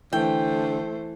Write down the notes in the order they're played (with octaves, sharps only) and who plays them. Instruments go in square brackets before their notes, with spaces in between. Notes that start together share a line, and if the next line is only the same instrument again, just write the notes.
[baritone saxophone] D3 [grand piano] E3 [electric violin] A3 C5 [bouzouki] G5